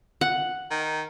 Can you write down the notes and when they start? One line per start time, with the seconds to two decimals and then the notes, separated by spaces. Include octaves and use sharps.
0.21 F#5
0.71 D#3